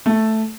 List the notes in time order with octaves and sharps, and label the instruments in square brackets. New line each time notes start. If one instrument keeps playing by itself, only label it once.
[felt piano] A3